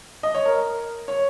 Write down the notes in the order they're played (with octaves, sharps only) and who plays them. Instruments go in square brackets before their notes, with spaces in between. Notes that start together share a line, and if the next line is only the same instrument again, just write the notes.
[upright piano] D#5
C#5
A#4
C#5